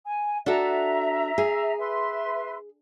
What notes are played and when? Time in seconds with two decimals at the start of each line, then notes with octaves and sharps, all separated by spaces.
0.06 G#5
0.46 D4 F#4 A4 E5 A#5
1.38 G#4
1.78 B4 E5 C6